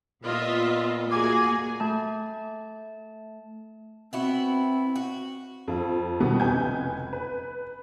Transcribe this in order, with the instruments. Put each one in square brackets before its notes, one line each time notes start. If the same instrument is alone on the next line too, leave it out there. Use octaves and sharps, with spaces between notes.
[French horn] A#2 [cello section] B3 [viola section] F4 D#5 E5
[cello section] A#3 F#4 G#4 [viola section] G#5 [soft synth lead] D6
[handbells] A3 A5
[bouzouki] B3 E4 F#4 [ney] C4
[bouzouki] F#4
[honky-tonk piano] F2 F4
C2 B2 D#3 G3 B3
F1 C#2 B4 G#5 G6
B4